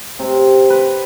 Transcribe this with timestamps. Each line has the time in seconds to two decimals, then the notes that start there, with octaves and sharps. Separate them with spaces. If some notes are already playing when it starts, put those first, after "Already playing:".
0.19 C3
0.70 B4